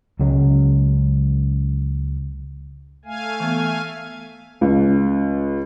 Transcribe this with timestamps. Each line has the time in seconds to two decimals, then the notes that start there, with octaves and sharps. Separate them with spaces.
0.20 C#2 C#3 F#3 G#3
3.05 A3 F5 G#5
3.40 E3 B3
4.61 C#2